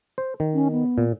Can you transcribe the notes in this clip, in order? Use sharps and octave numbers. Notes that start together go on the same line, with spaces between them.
C5
D#3
C#4
B3
A#2